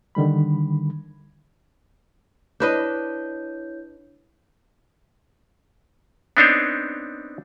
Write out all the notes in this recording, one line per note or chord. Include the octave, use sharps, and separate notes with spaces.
D3 D#3 G3 B5
D4 E4 B4 C#5 D#5 G6
B3 C4 D4 D#4 C5 C#5